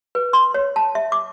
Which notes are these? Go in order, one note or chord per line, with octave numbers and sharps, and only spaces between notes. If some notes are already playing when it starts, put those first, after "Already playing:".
B4
C6
C#5
A5
E5
D6